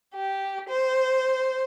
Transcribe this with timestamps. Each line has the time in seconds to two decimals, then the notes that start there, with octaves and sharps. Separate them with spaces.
0.14 G4
0.69 C5